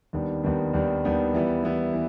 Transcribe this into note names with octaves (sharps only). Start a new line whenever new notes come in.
D#2 D#3 G3 B3 D4
D#2 D#3 G3 B3 D4
D#2 D#3 G3 B3 D4
D#2 D#3 G3 B3 D4
E3 G3 B3 E4
E3 G3 B3 E4
E3